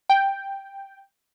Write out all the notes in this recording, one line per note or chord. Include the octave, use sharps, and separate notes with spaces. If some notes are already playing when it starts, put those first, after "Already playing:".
G5